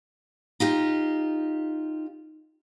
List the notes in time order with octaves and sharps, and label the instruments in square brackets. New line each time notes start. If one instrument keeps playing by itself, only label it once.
[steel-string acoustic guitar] D#4 F4 G4